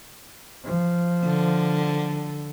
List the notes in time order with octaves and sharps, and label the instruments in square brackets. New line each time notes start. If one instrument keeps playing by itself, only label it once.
[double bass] F3
[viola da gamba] D3